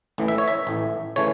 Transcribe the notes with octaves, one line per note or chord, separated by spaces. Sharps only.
A1 A2 E3
E5
C#5
E5
A1 A2 E3
C#3 E3 A3 C#5